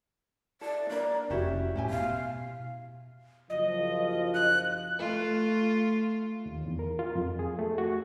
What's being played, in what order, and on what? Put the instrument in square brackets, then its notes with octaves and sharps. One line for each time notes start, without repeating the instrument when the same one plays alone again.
[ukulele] E4 A4 [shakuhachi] D5
[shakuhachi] A#3 [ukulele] D4 B4 D5
[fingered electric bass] F1 [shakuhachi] C#4 [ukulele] E4 F#4 G4
[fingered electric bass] A2 [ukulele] E4 G4 G#5
[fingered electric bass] B2 [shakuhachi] F5
[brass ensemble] F#1 F3 F4 [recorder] D#5
[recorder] F#6
[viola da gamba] A3 F4
[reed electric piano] D#2
E2
A#4
F4
F2
G#4
A3
F#4